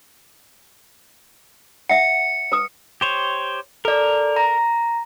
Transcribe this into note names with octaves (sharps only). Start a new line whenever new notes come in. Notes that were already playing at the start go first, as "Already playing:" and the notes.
E5 F#5 C#7
B4 D#6
G4 C5 C#5
A4 A#4 D5
A#5